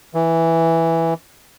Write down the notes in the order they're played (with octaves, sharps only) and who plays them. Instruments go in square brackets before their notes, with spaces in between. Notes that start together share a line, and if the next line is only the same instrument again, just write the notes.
[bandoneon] E3